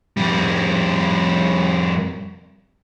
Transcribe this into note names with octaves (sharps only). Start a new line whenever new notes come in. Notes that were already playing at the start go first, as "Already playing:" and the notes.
F2 G3